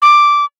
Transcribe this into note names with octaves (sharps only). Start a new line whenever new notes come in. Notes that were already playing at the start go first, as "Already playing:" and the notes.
D6